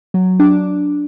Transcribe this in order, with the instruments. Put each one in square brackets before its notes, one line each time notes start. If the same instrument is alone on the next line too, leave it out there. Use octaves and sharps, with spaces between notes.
[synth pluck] F#3
D4